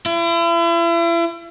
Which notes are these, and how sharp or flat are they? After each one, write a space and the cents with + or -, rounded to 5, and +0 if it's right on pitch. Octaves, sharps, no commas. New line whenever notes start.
E4 +40